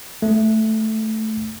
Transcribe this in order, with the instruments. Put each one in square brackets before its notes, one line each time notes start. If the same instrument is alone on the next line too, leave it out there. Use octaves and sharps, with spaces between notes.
[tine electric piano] A3